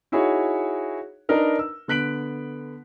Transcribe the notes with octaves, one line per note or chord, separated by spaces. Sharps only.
D#4 E4 F#4 G#4 C#5
D4 D#4 A#4 B4
E6
D3 B3 F#6 B6 D7 F#7